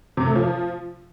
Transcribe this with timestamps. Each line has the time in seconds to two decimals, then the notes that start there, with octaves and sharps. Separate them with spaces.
0.17 C3
0.26 A3
0.35 F3